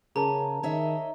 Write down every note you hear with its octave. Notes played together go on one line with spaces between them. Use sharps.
C#3 C#4 G#4 A#4 A5 A#5
D#3 C#5 D#5 E5